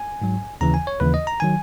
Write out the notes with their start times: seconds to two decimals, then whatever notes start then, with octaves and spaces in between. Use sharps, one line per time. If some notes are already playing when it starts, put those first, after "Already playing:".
Already playing: G#5
0.22 G#2 F#3
0.61 D#2 C#3 E3 A#5
0.74 G#5
0.87 C#5
1.00 D#2 C#3 E3 B4
1.14 D#5
1.27 A#5
1.40 D#3 F#3 G#5